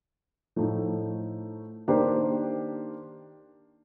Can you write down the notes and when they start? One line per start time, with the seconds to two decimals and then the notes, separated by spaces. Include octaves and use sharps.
0.56 A2 F3 A3 D#4
1.88 D#3 A#3 D4 G4 C5